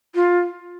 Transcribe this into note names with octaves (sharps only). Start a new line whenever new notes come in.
F4